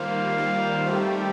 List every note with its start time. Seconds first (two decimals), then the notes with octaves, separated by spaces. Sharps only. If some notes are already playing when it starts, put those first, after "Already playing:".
Already playing: D#3 G3 A#3 F4 C5 F5
0.38 D#3 G3
0.87 D#3 G3 A3 C4 G4